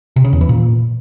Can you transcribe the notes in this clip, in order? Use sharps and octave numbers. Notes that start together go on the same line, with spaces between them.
C3
C#3
E2
E3
A#2